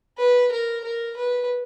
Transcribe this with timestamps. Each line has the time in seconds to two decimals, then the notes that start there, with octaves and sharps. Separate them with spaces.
0.18 B4
0.51 A#4
0.84 A#4
1.16 B4